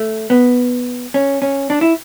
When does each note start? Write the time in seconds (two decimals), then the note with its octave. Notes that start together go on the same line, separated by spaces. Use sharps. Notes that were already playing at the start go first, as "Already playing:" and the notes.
Already playing: A3
0.30 B3
1.14 C#4
1.42 C#4
1.70 D4
1.81 E4